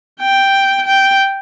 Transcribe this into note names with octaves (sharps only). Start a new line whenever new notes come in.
G5
G5